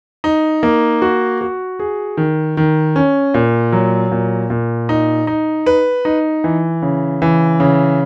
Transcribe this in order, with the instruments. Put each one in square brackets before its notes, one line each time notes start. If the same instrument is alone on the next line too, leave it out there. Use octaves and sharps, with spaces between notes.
[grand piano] D#4
A#3
F#4
F#4
G#4
D#3
D#3
C#4
A#2
F#3
A#2
A#2
D#4
D#4
B4
D#4
E3
C#3
E3
C#3